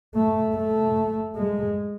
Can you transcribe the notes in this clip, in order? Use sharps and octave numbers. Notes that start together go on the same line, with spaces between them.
A3
A3
G#3